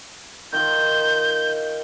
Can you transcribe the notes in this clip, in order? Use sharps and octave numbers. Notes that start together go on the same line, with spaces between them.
D#3 D#4 F4 G6